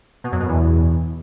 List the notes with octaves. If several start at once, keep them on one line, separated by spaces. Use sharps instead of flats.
B2
F#2
B2
E2